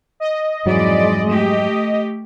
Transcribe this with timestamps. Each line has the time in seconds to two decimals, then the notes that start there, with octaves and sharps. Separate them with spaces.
0.20 D#5
0.66 F2 G#2 E3 F#3 G#3 D5
1.27 A3 G4